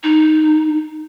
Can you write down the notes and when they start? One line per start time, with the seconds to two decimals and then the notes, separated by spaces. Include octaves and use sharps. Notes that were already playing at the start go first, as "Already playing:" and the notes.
0.03 D#4